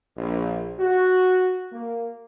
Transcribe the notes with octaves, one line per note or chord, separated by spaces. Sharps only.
A#1
F#4
A#3